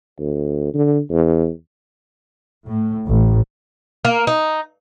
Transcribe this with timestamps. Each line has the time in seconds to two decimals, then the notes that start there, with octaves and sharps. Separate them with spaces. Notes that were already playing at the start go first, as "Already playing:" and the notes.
0.19 D2
0.74 D3
1.11 E2
2.67 A2
3.06 A1
4.05 A#3
4.27 D#4